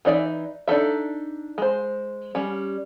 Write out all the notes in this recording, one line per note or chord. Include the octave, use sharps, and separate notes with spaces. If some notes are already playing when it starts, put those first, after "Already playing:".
E3 D#4 D5 E5
D4 D#4 A4 E5
G#3 C5
G3 C#4